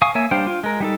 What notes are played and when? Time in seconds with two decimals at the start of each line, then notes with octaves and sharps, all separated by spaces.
0.02 F5 G#5 C#6 D#6
0.15 A#3 C#5 E5 G#5
0.31 G3 D4 C5 F5 G5
0.47 F4
0.64 G#3 A#4
0.80 G3 D#4 A4